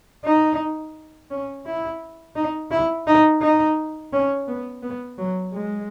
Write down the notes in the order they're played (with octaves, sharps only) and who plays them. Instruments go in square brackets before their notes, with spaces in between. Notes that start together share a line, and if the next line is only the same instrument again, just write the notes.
[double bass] D#4
C#4
E4
D#4
E4
D#4
D#4
C#4
B3
B3
F#3
G#3